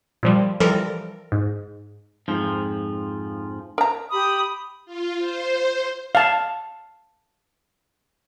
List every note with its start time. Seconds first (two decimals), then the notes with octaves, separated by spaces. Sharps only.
0.23 A#2 F3 G3
0.60 E3 F3 G3 A4 A#4
1.32 G#2
2.28 F2 G#2 F3
3.78 A#4 A#5
4.11 G4 B5 D#6
4.86 F4
5.19 C5
6.15 F5 A5